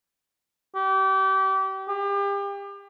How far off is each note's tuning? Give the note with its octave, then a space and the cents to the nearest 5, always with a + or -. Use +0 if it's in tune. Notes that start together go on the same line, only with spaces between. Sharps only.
G4 -30
G4 +35